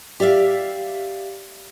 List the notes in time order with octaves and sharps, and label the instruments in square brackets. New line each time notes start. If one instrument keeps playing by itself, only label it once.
[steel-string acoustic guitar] G4 D5 E5 F5